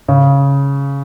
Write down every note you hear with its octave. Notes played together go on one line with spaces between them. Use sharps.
C#3